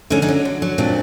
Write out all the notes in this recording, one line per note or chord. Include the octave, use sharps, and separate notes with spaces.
D3 C#4 D#4
C#4 D#4
F#3
D3
F#3
A#2 C4 D4